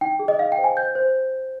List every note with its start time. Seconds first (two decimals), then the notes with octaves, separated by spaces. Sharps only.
0.01 D#4 G5
0.19 G#4
0.28 D#5
0.39 D#4 F5
0.52 G5
0.58 C5
0.64 G#5
0.77 C5 G6
0.95 C5